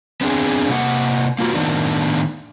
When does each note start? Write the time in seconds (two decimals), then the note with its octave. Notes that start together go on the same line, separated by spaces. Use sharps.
0.21 B3 C4 D4 G#4
0.69 C3 A#3 F#5
1.39 A#3 F4 F#4
1.55 A2 D#3 B3 D4 D#4